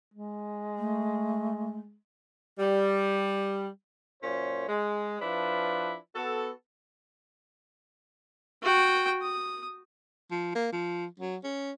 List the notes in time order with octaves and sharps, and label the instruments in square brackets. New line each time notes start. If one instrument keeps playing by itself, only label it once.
[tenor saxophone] G#3
[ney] A3
[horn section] G3
F#2 A#2 C#4 C5 C#5
G#3
F3 D4 E4 B4
B3 F#4 A4
[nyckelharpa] F#4 G5
D#6
[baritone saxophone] F3
A#3
F3
F#3
C#4